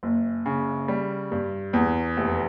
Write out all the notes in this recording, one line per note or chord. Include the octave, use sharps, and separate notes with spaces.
F#1
C#3
G3
G2
E2
F1